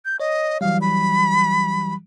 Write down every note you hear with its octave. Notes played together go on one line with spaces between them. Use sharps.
G6
C#5 D#5
E3 F#3 G3 F5
B5